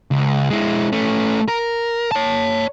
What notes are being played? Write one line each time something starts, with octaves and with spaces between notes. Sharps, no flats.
C#2
G#3 E4
A3 C#4
A#4
C#5 A5